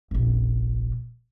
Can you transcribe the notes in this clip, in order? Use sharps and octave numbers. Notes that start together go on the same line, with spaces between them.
F1 A#1